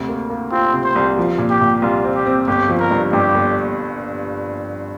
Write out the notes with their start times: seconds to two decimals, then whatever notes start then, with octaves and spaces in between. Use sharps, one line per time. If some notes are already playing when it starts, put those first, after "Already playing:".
Already playing: D2 C3
0.09 A#3
0.30 A#3
0.52 C4 F4
0.73 C3
0.84 C5
0.96 C2
1.17 F3
1.38 A#2
1.50 G4
1.61 A#2
1.82 C2 F4
2.04 C4
2.15 G4
2.26 C4
2.47 G1 G4
2.69 F3
2.80 A#4
2.91 G2
3.13 G2 G4
3.34 G1